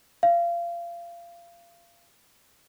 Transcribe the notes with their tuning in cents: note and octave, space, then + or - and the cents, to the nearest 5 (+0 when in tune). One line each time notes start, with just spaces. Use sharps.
F5 -25